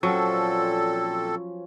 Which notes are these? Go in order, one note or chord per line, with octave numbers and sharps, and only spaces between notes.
A#2 F3 F#3 C4 C#4 A4